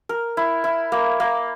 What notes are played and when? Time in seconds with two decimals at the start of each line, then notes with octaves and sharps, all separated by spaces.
0.09 A#4
0.37 E4
0.64 E4
0.92 A#3
1.20 A#3